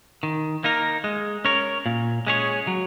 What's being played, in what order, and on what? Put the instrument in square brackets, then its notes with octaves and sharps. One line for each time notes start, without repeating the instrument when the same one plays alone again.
[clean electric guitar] D#3
A#3 D#4 A#4
G#3
C#4 A#4 C#5
A#2
G#3 C#4 G#4 C#5
F#3